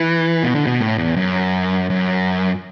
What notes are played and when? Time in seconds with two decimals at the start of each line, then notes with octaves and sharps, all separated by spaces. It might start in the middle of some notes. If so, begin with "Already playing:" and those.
Already playing: E3
0.43 B2
0.55 D3
0.67 B2
0.80 A2
0.98 E2
1.16 F#2
1.90 F#2